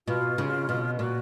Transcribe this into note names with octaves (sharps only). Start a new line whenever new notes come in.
B2 F4
C#3
B2
A#2 F#4